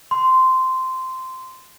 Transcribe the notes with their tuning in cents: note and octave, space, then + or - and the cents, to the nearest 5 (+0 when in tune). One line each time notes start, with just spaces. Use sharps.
C6 -15